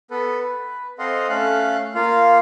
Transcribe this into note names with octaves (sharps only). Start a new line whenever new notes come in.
B3 A4 B4
B4
C4 A4 D#5 F5 F#5 C6
A3 C#4 A4 F5 F#6
A#3 F4 F5